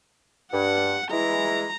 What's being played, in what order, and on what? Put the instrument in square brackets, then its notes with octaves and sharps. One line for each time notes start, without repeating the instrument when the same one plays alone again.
[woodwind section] G2 [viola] F#5
[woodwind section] E3 G#3 E4 [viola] A#5